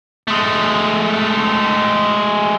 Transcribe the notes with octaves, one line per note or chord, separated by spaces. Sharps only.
G#3 A3